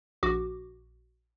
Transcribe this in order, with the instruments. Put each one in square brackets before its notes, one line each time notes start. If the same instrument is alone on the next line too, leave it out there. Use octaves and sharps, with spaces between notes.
[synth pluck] A#1 F#4 D6